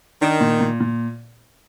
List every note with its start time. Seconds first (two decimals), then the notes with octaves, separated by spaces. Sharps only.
0.21 D#3 D4
0.41 A#2
0.61 A#2
0.80 A#2